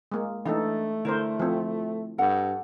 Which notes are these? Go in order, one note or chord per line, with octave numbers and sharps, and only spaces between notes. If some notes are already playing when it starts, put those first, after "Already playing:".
G#3 A#3
E3 A3 D4 D#4 A4
D3 E4 A#4 C5
F3 C4
G2 A4 F#5